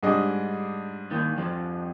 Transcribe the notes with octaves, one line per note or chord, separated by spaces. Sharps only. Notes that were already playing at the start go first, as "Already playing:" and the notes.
G#2 G3 D4 G#4 D#5
D#2 D#3
F2 F3